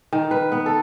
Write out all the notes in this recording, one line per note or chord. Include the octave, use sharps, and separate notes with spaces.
D#3
B4
B3
A4